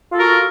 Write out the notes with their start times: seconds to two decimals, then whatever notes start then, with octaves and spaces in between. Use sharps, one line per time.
0.11 F4
0.13 A4
0.16 A#4
0.19 F#4